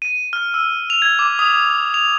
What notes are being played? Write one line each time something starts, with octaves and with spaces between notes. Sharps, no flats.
D#7
F6
E6
F7
G#6
D6
D#6
F7